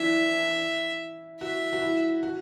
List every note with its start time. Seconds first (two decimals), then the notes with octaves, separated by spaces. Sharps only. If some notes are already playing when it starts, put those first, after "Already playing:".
Already playing: E3 D4 E4 E5
1.41 F#4 E5
1.73 F#4
1.82 E4
2.23 F#4